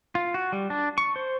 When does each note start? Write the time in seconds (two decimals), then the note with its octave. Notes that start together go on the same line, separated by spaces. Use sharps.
0.15 F4
0.34 F#4
0.52 G3
0.70 D4
0.98 C#6
1.16 C5